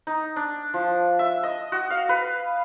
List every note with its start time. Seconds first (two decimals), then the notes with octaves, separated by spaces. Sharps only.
0.07 D#4
0.36 D4
0.74 F3
1.19 E5
1.43 D#5
1.72 F#4
1.90 F5
2.09 B4